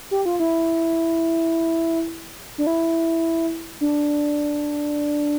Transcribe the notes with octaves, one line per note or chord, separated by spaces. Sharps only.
G4
F4
E4
D4
E4
D4